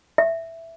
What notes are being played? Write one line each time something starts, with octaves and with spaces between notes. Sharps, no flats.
E5